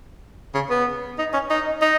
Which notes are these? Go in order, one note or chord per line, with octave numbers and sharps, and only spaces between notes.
C#3
B3
D#4
C#4
D#4
D#4